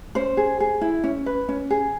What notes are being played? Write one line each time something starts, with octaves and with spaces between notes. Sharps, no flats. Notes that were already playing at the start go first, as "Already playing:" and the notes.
C#4 C5
G#4
G#4
E4
C#4
B4
C#4
G#4